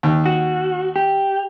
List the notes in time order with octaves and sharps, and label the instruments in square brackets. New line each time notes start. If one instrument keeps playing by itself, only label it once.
[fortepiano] D#2
[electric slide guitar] F#4
G4